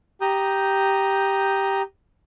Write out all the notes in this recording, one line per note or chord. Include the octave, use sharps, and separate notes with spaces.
G4 A#5 D#6 G6